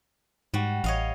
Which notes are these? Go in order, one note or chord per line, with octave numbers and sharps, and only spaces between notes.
G#2 G3 F#4
A1 C#5 D#5 F5